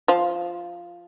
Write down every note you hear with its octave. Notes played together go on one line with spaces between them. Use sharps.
F3 F4